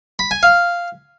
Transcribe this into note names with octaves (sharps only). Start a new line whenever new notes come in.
B5
G#5
F5